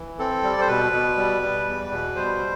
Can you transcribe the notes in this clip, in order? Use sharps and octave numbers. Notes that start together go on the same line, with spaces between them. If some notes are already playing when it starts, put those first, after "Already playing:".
Already playing: E3
C4 A4
G3
D5
C5
B2 B4
B2
G3
G3
E2
B2
G3 C5